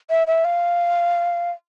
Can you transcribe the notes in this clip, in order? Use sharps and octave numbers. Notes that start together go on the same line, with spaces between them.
E5
E5
F5